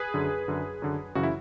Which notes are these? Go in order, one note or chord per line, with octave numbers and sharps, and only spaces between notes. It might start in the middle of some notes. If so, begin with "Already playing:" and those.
Already playing: G#4 B4
F#2 D3
F#2 D3
F#2 D3
F#2 C#3 E3 F#4
E4